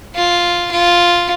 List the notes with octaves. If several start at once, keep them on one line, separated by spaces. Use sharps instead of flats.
F4
F4